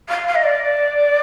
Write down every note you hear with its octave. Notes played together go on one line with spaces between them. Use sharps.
F5
F5
D#5
D5